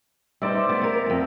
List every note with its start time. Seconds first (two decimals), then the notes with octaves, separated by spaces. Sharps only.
0.42 G3 D#4 C5 D5 E5
0.69 B3
0.82 B3 A#4
1.06 F2 G#2